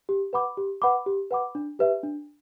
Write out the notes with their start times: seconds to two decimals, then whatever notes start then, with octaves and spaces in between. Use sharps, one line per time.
0.09 G4
0.33 B4 F#5 B5 D6
0.57 G4
0.82 B4 F#5 B5 D6
1.06 G4
1.31 B4 F#5 B5 D6
1.55 D4
1.79 G4 B4 E5
2.03 D4